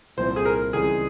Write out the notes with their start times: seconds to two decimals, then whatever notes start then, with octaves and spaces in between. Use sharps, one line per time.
0.17 C2 A#2 F3 C4 E4 C5
0.36 G#4
0.45 A#4
0.73 C#2 C#3 E3 G3 C4 G#4